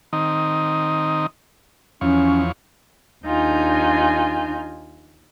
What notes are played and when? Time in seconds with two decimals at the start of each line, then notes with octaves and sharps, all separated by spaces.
0.13 D#3 C4 D#4
2.01 E2 F3 C#4 C#5
3.25 D#2 D4 D#4 F4 G#5 G6